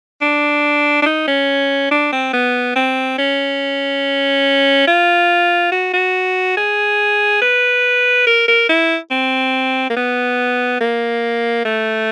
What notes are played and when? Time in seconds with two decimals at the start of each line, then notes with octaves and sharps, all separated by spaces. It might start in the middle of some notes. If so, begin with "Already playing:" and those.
0.22 D4
1.02 D4
1.06 D#4
1.28 C#4
1.91 D4
2.12 C4
2.34 B3
2.76 C4
3.18 C#4
4.87 F4
5.72 F#4
5.94 F#4
6.57 G#4
7.42 B4
8.27 A#4
8.48 A#4
8.69 E4
9.11 C4
9.90 A#3
9.97 B3
10.81 A#3
11.65 A3